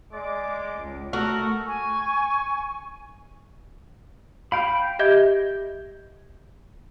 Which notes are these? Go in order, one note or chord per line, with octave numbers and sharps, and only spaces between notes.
G#3 D5 D6
C#2
A3 F#4 A4 A#4
G#5 C#6
F5 G5 B5
G4 D#5 E5 G6 G#6 G7